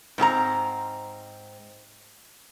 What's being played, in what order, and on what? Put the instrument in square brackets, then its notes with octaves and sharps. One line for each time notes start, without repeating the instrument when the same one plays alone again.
[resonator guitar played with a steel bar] G#2 C4 G4 A#5